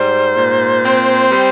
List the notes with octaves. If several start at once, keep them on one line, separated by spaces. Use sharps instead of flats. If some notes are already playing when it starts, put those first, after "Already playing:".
Already playing: G#2 G3 C5
A#2
C4
G3 C5